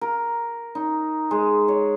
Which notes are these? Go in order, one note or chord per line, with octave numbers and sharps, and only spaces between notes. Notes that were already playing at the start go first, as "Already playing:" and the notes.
A#4
D#4
G#3
C#5